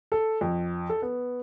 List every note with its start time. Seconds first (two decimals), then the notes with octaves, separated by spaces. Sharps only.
0.12 A4
0.41 F2
0.90 A4
1.02 B3